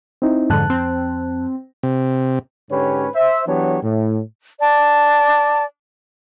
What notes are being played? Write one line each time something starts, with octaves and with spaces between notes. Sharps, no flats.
C4 D#4 E4
F2 G#2 D3 A5 F#6
C4
C3
G#2 D3 C#4 G4 B4 C#5
C5 E5
E3 F#3 B3 D4 G4 C#5
A2
D5 A5